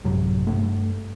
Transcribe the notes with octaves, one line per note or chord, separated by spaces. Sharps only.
A1 F#2 C3 F#3
G2 A3